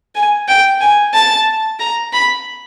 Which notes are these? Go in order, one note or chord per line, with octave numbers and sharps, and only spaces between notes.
G#5
G5
G#5
A5
A#5
B5